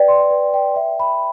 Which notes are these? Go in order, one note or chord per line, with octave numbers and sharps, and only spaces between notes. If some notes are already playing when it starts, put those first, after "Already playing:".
Already playing: B4 D5 G5
C6
B4
G5
E5
B5